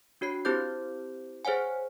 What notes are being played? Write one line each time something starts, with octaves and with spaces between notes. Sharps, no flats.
D4 F#4 C#5 C7
C4 E4 G4 C5 D6 G6
G#4 C5 C#5 F#5 G#5